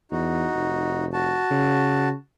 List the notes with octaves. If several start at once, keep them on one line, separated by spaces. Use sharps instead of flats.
E2 D#4 F#4
F1
F#4 A5
C#3